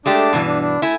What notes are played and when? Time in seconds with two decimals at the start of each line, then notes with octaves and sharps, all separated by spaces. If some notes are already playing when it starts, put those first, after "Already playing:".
0.06 G#3 A3 D4 G4 A5 D6
0.33 G2 B2 E3
0.47 D4
0.61 D4
0.82 A3 E4 G#5